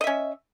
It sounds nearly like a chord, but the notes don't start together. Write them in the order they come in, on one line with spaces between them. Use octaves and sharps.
D#5 E5 C#4